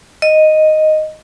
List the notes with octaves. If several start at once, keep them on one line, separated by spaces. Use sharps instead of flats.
D#5